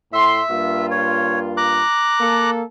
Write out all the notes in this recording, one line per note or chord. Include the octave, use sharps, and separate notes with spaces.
A2 E5 C6
G2 A#3 F4
C#5
A#5 D6 F#6
A#3 A4